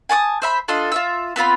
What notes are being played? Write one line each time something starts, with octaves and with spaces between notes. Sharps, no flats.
G#5 A5 D6 D#6
C5 E5 B5
D4 F4 A4 D#5
F4 E5 E6
B3 C4 F4 B5